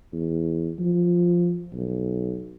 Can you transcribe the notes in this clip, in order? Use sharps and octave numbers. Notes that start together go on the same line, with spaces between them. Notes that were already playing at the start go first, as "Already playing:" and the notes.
E2
F3
B1